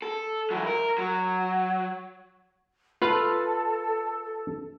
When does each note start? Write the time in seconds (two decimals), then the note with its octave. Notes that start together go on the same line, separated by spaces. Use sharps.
0.02 A4
0.51 E3 F#3
0.67 A#4
0.98 F#3
3.02 F4 A4 B4 F5